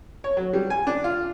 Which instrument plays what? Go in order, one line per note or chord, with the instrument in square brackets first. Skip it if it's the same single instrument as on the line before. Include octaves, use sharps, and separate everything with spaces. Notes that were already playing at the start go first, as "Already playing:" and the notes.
[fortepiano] C#5
F#3
G3
G#5
D4
F4